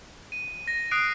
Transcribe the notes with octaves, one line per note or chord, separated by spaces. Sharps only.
D#7
A#6
D#6 F#6 C7 D7